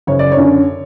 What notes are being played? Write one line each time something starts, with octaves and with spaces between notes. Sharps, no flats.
F#1 C#5
D5
C#5
F#2 D3